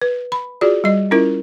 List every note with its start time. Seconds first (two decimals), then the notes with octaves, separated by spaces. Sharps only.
0.02 B4
0.32 B5
0.61 F4 F#4 G#4 D5
0.84 G3 D#5
1.11 C#4 E4 F4 A#4